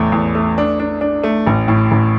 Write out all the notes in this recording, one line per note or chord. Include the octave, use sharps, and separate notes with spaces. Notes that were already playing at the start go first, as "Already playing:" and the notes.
Already playing: A1 E2 A3
E2
A3
D4
D4
D4
A3
A1
A2
A1